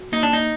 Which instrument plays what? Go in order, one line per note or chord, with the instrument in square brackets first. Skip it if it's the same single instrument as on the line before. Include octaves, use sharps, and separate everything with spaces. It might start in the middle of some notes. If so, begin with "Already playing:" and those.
Already playing: [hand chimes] F#4
[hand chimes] A#3 [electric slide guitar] D#4
[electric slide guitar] D4
D#4